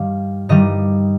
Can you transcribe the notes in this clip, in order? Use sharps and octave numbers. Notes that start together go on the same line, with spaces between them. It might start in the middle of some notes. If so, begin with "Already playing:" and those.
Already playing: G2 D#3 G3 F5
G2 D#3 G3 D#5